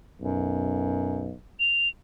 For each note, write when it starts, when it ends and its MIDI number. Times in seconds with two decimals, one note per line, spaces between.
0.21 1.32 35
0.21 1.31 42
1.60 1.89 101